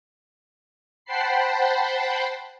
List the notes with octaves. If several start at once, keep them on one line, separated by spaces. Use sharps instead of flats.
C5 F#5 G5 A5 B5 C7